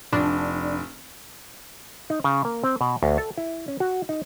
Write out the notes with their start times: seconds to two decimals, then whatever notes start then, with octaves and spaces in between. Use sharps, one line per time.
0.13 F1 D4
2.10 D#4
2.24 C#3
2.45 A#3
2.64 C4
2.81 B2
3.03 D2
3.18 A4
3.38 E4
3.68 C#4
3.80 F#4
4.09 D#4